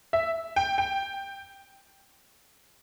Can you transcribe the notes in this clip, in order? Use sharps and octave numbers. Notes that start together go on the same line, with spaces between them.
E5
G5
G5